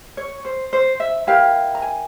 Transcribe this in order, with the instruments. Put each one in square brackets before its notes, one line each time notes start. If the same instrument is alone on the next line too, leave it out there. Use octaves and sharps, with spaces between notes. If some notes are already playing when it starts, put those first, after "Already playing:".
[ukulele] C#5
C5
C5
E5
E4 G4 A#4 F5
A#5
G#5